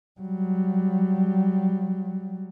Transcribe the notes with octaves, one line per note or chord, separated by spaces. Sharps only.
F#3 G3